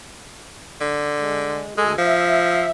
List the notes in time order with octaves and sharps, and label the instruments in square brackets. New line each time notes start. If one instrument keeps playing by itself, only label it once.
[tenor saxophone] D3
[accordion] G#3
[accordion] D2 A4 G#5 [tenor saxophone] G#3
[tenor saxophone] F3 [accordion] E5